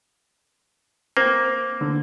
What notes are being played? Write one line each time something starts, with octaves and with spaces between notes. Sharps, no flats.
A#3 C4
D3